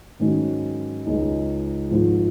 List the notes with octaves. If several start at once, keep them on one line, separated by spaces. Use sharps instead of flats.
G#2 D#3 F#3 C#4
C#2 C#3 G#3 D#4
G#1 G#2 F3